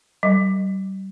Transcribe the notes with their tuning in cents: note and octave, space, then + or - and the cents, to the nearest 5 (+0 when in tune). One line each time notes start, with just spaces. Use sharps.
G3 -35